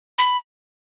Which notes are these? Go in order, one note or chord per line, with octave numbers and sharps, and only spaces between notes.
B5